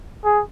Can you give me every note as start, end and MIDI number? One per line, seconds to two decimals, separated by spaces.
0.25 0.42 68